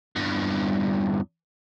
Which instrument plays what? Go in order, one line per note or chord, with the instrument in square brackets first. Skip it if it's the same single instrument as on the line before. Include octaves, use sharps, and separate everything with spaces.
[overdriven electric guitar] E2 G2